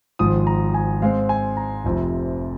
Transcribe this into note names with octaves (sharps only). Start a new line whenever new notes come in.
G#1 G#2 F3 D#6
A#5
G#5
G#2 G#3 C4 F5
G#5
A#5
F1 F2 C3 F3